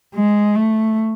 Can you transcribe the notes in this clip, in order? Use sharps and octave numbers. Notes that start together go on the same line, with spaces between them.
G#3
A3